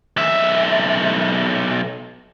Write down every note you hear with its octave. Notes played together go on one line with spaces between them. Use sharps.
B1 E5